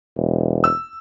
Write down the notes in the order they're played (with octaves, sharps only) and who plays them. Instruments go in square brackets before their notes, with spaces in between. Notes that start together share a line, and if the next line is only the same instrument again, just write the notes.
[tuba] E1
[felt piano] E6